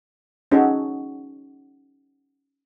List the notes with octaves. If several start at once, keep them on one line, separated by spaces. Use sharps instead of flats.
C#4 D#4 F#4 G#4 A4 C#5